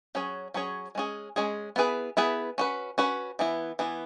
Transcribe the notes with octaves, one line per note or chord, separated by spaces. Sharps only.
F#3 C#4 G#4 C#5
F#3 C#4 G#4 C#5
G#3 C#4 G#4
G#3 C#4 G#4
B3 E4 G#4 B4
B3 E4 G#4 B4
C#4 F#4 B4
C#4 F#4 B4
E3 B3 E4
E3 B3 E4